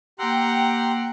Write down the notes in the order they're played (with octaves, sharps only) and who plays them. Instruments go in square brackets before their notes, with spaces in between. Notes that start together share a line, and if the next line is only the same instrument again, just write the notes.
[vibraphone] A#3 E6 [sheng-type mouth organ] G4 A#5 C6 [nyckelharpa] F#5 G5